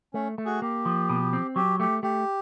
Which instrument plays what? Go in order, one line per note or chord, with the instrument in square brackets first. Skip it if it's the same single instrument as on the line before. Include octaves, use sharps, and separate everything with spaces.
[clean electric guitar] A3 [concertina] C#4
[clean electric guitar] A3
[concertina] F#4 G#4
[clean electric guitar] A#3 [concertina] G4
[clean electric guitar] F3
B2
C4
[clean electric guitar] F#3 [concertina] G4
[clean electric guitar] A3 [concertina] G4
[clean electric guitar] A3 [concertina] G4